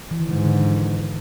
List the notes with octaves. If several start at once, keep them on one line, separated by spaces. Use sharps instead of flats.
E3
D#3
G#2 D3
D3
E3